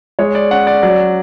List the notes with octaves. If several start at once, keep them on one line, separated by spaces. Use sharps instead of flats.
G#3 C#5
D5
C#4 F#5
D5
F#3 D5